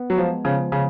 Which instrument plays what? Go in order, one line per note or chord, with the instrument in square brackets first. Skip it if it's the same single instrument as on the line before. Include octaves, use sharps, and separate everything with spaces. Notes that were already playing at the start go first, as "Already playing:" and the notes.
Already playing: [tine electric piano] B3
[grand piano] F#3
[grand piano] F3 [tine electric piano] G#3
[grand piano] C#3 [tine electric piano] F3
[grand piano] C#3 [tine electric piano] C#4